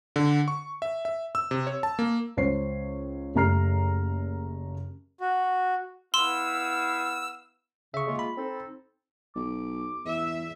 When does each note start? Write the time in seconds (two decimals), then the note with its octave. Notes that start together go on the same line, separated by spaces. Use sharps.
0.16 D3
0.48 C#6
0.82 E5
1.05 E5
1.35 E6
1.51 C3
1.67 C#5
1.83 A5
1.99 A#3
2.37 C#2 C5 C#5 C7
3.35 F#1 A3 G4 A#5 F6 C7
5.20 F#4
6.14 B3 E4 F5 C6 E6
7.94 C#3 E5 C#6
8.06 G#3 A#3 F4
8.19 B5
8.37 C4 D#4 A4
9.36 B1 D6
10.05 E2 E5